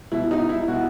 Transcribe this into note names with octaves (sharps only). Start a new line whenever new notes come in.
B2 E4
D#4
E4
B2 F#4